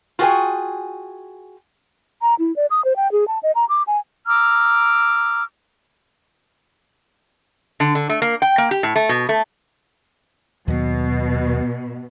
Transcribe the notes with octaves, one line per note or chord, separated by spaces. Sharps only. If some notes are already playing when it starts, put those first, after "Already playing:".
F4 F#4 G#4 A4 G5 G#5
A#5
E4
D5
D#6
C5
G5
G#4
A5
D#5
A#5
D6
G#5
A#5 D6 E6 F6
D3
D3
A3
A#3
G5
A#3
G4
A2
A3
B2
A3
D#2 B2 F#3